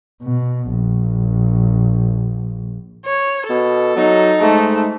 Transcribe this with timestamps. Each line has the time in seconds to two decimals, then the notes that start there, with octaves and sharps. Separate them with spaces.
0.23 B2
0.72 A#1
3.06 C#5
3.50 B2 A4
3.97 F#3 D#4
4.41 G#2 A3